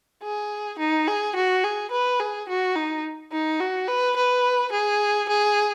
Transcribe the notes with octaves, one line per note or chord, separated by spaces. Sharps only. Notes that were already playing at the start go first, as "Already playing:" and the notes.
G#4
D#4
G#4
F#4
G#4
B4
G#4
F#4
D#4
D#4
F#4
B4
B4
G#4
G#4